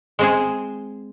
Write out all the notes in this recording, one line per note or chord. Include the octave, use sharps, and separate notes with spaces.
G#3 C4 G#4